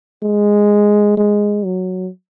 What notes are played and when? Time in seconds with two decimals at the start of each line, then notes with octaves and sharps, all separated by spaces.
0.22 G#3
1.18 G#3
1.65 F#3